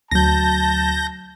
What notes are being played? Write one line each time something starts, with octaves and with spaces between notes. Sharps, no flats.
D2 F#3 A5 G6 A#6